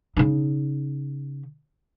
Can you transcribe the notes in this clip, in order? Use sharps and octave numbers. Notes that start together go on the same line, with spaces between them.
C#3 D#4